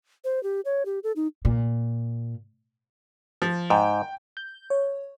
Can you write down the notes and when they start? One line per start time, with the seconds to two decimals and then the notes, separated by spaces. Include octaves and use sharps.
0.24 C5
0.43 G4
0.65 C#5
0.85 G4
1.03 A4
1.16 D#4
1.45 A#2
3.42 F3
3.70 G#2 G5
4.37 G6
4.70 C#5